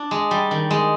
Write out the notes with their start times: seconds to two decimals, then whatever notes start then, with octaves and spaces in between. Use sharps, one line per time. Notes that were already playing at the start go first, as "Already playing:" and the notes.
Already playing: D4
0.11 G#3
0.31 G3
0.51 D#3
0.71 G#3